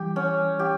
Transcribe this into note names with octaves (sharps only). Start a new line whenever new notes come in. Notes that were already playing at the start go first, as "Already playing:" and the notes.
Already playing: E3 G3 G4
C#4
G4